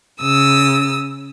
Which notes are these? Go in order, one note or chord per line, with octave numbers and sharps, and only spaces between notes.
C#3 D#6 E6